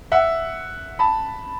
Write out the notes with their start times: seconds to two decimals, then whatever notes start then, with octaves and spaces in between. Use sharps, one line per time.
0.12 E5 F#5
0.99 A5 B5